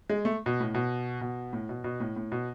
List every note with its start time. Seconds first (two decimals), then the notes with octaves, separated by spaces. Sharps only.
0.10 G#3
0.25 A3
0.46 B2
0.60 A2
0.74 B2
1.21 B2
1.53 A2
1.69 B2
1.84 B2
2.00 A2
2.16 A2
2.32 B2